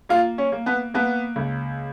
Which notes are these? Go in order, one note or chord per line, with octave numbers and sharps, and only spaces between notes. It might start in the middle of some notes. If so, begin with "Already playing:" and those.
A#3 F4
C#4
A#3
B3
A#3 B3
C#2